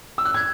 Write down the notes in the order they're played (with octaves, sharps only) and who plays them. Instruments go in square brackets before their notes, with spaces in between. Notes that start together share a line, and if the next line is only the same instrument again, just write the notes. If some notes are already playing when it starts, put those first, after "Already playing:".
[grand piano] E6
F#6
G#6